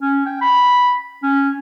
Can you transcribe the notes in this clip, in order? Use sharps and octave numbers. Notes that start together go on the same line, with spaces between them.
C#4
G5
B5
C#4